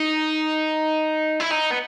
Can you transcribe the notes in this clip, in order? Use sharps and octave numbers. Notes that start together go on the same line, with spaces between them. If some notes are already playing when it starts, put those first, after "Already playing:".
Already playing: D#4
E4
D#4
B3